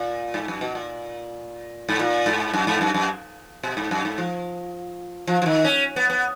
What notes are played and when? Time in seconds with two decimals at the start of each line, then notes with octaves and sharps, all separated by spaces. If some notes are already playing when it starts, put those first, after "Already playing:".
Already playing: A#2
0.34 G#2
0.48 F#2
0.61 B2
0.75 A#2
1.89 G#2
1.99 A#2
2.26 G#2
2.53 F#2
2.67 G#2
2.81 F#2
2.94 F#2
3.63 B2
3.77 G#2
3.91 F#2
4.05 G#2
4.18 F3
5.27 F3
5.42 F3
5.46 D#3
5.64 C#4
5.96 B3
6.10 B3